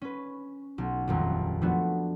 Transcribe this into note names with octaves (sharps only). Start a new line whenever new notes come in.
C#4 B4
B1
D#1 A#1 F2 A#5
F3 A3 B3 D4 F#4